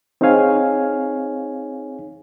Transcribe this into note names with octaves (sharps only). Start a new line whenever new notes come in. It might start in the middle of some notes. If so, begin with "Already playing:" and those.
C4 D#4 G#4 C#5 F5 G#5